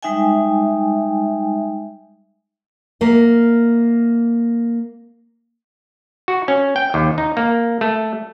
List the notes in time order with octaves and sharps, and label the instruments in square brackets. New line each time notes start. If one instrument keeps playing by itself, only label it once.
[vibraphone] G3 G#3 D#4 E5 G5 G#5
[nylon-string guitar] A#3 A#4 E5
[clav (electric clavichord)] F#4
C#4
G5
D#2
D#4
A#3
A3